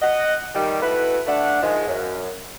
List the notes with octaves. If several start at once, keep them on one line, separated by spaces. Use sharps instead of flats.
D#5 F#5
D#3 G3
A3 B3 E4 F#4 B4
A3 D4 F#5
G#2 D#3 F3 G#3
F#2